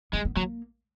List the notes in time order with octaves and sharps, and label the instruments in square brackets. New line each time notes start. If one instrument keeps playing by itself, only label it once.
[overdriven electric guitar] G#3 [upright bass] B3
[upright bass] B3
[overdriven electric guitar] F#3 [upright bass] A#3